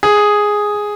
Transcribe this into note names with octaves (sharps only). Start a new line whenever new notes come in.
G#4